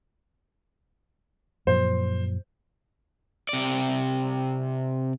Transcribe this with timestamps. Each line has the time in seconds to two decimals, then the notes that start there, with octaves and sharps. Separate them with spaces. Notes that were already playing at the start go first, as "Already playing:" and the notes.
1.67 F#2 A#2 F3 C5
3.49 C3 D5